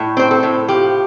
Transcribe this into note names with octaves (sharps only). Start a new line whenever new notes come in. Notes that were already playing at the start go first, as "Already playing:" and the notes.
Already playing: A2
C4 C5
A4
A2
F3 G4